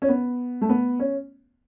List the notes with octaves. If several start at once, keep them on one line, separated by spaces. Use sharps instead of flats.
C#4
B3
A3
B3
C#4